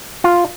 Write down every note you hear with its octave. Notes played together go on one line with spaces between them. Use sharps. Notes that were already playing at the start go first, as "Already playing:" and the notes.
F4